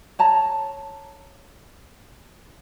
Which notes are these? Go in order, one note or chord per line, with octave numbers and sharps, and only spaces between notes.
C#5 A5 A#5